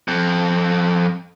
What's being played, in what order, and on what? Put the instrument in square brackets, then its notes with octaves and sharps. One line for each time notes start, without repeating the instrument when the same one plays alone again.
[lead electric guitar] F2